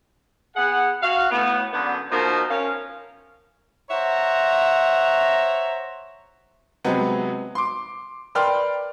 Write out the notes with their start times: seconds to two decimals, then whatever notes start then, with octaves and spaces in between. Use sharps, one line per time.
0.56 B3 G#4 F#5
1.02 F#4 F5
1.31 A2 B3
1.73 F#2 D3 B3
2.11 B2 F3 D#4 A#4 C5
2.50 C#4 A#4 F5
3.90 C5 C#5 E5 F#5 A#5
6.84 C3 F#3 G#3 B3 C4
7.55 C6 D6
8.35 A#4 B4 D5 G5 C6 F6